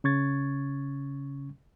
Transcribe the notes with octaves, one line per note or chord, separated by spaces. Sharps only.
C#3 C#4 C#6 G#6 A6